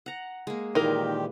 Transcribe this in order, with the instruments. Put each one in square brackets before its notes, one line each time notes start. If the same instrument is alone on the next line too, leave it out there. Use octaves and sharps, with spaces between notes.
[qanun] F#5 A#5
G#3 A#3
[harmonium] A#2 D#3 G4 [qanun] E3 [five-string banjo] D#4 A#4